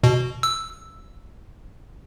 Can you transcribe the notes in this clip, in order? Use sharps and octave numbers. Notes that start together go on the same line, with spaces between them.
B2
E6